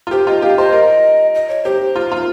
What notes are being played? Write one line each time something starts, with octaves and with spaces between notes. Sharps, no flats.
F4
G4 C5
F4 D#5
G4 F5
C5 D#5
A#4
D#5
C#5
G4 C5
F4
F4